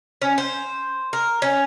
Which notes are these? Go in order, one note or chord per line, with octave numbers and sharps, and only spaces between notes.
C#4
C5
A#4
C#4